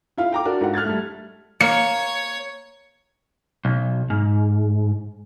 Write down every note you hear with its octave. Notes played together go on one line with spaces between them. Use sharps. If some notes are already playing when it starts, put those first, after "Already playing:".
E4 F4 F5
G5 A#5 D6
D4 F#4 A#4 D5
G#2 F4 F#5
F6 F#6 G#6 A6
G3 A3
A#3 C#5 C#7
B1
G#2